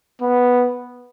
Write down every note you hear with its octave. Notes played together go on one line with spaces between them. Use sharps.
B3